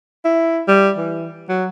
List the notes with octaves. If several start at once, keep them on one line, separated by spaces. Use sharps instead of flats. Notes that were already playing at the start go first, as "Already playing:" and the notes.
E4
G3
E3
F#3